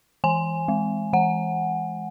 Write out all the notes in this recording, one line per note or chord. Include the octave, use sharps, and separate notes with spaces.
E3 G#5
G#3
E3 F#5